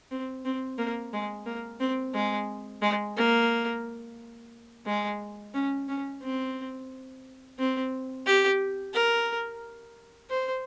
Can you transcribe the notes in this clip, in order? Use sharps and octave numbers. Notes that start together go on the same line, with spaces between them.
C4
C4
A#3
G#3
A#3
C4
G#3
G#3
A#3
G#3
C#4
C#4
C4
C4
G4
A#4
C5